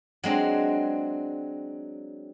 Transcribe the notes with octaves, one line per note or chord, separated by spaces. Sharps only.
F#3 G#3 C4 D4